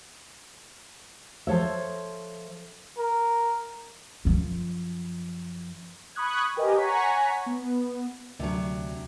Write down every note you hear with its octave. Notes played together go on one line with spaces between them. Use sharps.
F3 A4 C#5 E5
A#4
F#2 F3
B5 C#6 D#6 F#6 G#6
G4 A#4 B4 D#5 G#5
C#5 F#5 G#5 A#5 C#6 B6
B3
D2 C3 F#3 D4